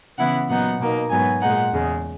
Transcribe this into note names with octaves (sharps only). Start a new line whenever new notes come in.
C#3 E3 B3 E4 F#5
A#2 F#3 B3 D#4 F#5
B2 A#3 D#4
G#2 F#3 B3 G#5
A#2 G#3 D#4 F#5
E2 C#3 G#3